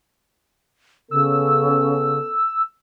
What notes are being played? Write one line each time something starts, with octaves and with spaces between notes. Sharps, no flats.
C#3 B3 C#4 A4 E6